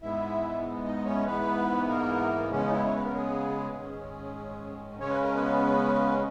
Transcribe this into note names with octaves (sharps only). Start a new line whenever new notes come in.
G#2 E3 G#3 B3 E4 E5
D#4 D#5
C#4 C#5
G#2 E3 B3 B4
A#3 A#4
C#3 G#3 B3 C#4
D#4
E3 E4
C#5
B4
A#4
G#3 G#4
G#2 D#3 G#3 C#4
C#3 G#3 C#4 C#5
B4
A#4
B3 B4